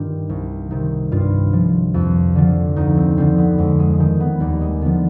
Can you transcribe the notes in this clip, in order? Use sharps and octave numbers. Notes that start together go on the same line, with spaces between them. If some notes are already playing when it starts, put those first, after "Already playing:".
Already playing: G2 D#3 F4 G4
C2
C3 D#3
G2 F4
F3
F2
D3 F3
D2 D#4
C4
D3 F3 C4
B3
F2 G#3
G#3
D#3 G#3
B3
D#2 G3
G#3
D3 F3 B3